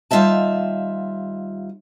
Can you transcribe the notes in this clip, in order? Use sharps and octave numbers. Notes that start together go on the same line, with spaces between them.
D#2 G3 F4 D#5 E5 A5